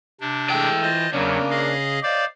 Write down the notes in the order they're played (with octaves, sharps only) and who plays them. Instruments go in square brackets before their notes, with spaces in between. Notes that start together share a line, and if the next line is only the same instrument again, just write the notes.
[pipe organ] C3 D4
[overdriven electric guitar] E3 G5 [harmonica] G#3 A3 E6
[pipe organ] F4 C5 D#5
[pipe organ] E2 F#3 [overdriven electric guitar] C#3 [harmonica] A#3 D4
[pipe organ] G#4 D#5 F5
[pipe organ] C5 D5 F5 [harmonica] D#5 D6